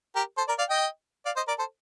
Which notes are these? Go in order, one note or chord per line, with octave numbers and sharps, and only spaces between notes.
G4 A#4
A4 C5
A#4 D5
D5 F5
D#5 G5
D5 F5
C5 D#5
A#4 D5
A4 C5